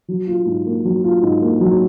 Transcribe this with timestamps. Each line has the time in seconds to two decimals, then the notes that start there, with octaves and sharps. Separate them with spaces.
0.08 F#3
0.27 F4
0.46 G#2
0.66 A#3
0.84 F#3
1.04 F4
1.22 G#2
1.42 A#3
1.60 F#3